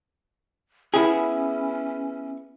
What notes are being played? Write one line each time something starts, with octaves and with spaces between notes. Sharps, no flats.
B3 C#4 E4 G#4